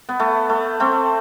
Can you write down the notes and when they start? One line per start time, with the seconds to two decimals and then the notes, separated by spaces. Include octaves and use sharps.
0.09 B3
0.20 A3
0.49 A3
0.80 A3 C4